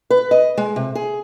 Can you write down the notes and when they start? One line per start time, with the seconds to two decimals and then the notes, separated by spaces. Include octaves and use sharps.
0.10 B4
0.31 D#5
0.57 G#3
0.76 C3
0.95 G#4